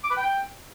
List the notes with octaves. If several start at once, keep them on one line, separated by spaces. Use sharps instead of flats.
D6
B4
G5